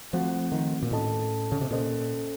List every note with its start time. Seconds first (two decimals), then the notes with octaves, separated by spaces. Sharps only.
0.13 F3 A3 C4 F#4 C5 F#5
0.52 D#3
0.82 A#2
0.91 A2 C#4 A4 D#5 A5
1.52 C#3
1.61 C3
1.71 A#2 C#4 A4 C5 D#5